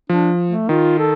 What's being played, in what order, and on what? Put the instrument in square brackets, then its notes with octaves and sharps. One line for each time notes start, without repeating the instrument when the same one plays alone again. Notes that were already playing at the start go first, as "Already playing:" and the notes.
[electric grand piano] F3 [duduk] D4
[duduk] A3
[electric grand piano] D#3 [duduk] F4
[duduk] A4